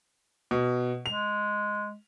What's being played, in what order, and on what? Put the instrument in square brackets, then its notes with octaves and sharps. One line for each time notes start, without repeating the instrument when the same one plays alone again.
[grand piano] B2
[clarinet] G#3 [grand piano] F7